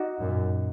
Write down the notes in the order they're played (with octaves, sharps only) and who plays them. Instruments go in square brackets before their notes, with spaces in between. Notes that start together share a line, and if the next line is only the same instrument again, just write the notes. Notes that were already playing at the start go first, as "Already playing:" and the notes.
Already playing: [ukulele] D#4 F#4 D5
[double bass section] F#2 A#2